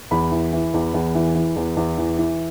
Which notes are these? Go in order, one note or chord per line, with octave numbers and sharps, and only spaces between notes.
E2 B5
E3
E3
E2
E2
E3
E3
E2
E2
E3
E3